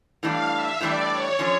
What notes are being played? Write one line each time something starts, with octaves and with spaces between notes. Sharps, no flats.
A2 E3 G3 D4 F5
E5
A2 E3 G3 D4 D5
C#5
D3 F3 C#4